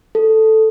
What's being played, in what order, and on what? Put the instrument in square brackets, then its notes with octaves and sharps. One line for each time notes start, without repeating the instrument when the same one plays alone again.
[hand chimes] A4